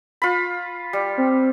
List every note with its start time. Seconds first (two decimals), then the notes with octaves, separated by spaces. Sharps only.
0.22 F4 B5
0.93 G3
1.18 C4